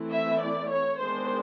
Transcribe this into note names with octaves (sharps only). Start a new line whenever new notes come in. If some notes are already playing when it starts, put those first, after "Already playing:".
Already playing: E3 A3 C4 E4
E5
D5
C#5
D#3 G#3 B3 D4 C5